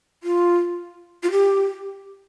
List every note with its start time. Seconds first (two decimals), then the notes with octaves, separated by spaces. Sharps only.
0.23 F4
1.23 F4
1.31 G4